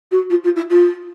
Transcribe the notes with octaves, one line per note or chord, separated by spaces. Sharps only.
F#4
F4
F4
E4
F4